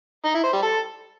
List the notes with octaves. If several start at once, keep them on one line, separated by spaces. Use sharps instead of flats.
D#4
E4
C5
G3
A4